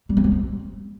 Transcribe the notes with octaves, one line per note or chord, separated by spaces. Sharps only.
G3
C4
G#3
C4